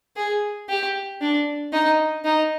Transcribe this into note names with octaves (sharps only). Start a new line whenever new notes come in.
G#4
G4
D4
D#4
D#4